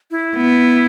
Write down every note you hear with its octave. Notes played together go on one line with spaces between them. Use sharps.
E4
B3